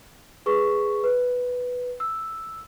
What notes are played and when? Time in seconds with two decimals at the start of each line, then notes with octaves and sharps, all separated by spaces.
0.46 G#4 B4 C#6
1.04 B4
2.00 E6